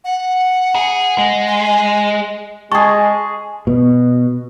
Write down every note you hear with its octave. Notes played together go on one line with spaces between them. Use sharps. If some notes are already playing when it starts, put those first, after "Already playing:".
F#5
G#4
G#3
G#5
G#3 G#4 A5 C#6
B2